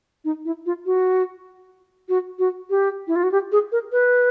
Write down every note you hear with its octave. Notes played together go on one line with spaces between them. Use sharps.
D#4
E4
F4
F#4
F#4
F#4
G4
E4
F4
F#4
G4
G#4
A#4
B4